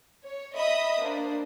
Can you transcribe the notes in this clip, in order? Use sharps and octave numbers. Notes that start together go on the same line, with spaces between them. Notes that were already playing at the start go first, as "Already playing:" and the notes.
C#5
D#5 E5 B5 D#6
A#3 D4 C5